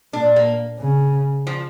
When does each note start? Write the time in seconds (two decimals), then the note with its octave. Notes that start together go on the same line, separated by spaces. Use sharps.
0.13 A#2 D4
0.36 A#3
0.80 C#3
1.47 F3